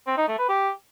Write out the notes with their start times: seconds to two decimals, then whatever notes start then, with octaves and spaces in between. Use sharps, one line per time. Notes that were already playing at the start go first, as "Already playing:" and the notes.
0.07 C4
0.17 D#4
0.28 A3
0.38 B4
0.49 G4